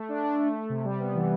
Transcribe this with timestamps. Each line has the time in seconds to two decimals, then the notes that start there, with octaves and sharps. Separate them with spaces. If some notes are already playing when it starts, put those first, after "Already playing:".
Already playing: A3
0.09 D4
0.24 D4
0.39 A3
0.54 A3
0.70 C3
0.85 G3
1.00 B3
1.15 E3